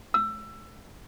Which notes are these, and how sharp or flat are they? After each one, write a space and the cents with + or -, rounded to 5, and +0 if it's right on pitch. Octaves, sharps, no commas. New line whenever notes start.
E6 +20